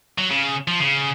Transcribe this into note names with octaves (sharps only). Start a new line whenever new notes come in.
F#3
C#3
F3
C#3